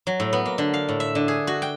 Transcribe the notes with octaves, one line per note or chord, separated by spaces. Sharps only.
F#3
A2
B3
A#3
D3
F5
A2
E5
D3
G#4
F#4
G5